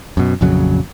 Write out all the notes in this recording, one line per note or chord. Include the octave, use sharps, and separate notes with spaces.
F#2 B2
A#1 F2 C#3 F#3